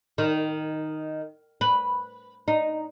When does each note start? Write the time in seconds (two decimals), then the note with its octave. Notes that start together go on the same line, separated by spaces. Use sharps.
0.18 D#3
1.61 B4
2.48 D#4